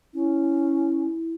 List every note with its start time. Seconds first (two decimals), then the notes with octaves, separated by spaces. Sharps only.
0.14 C#4 E4